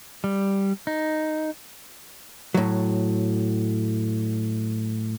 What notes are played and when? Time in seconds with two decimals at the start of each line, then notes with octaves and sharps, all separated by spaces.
0.24 G3
0.87 D#4
2.54 A2 F#3